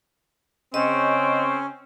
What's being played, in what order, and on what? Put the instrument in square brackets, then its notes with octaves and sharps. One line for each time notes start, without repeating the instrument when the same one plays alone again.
[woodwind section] C#3 G5 C#6 [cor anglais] C4 [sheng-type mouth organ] C#4 [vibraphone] D#5